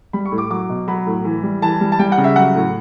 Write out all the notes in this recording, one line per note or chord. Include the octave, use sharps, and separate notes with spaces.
G3 B5
C#6
A2
D6
F#3 D6
B2
F#3 B5
A2
E3
G3
E3 A5
G3
A5
G3 G5
F#5
C#3
E5
F#3 F#5
A2